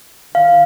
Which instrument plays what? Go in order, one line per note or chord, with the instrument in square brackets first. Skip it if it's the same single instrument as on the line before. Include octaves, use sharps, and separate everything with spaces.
[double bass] D#3 [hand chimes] F5